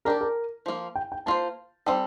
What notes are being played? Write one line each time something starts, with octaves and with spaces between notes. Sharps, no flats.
D4 G4 A#4 D5
A#4
F3 A#3 F4
G5
G5
A#3 F4 C5 A5
G3 C4 D#4 A4 G5